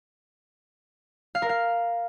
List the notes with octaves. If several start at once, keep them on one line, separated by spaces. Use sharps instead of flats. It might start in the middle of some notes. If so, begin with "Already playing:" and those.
F5
A#4
F5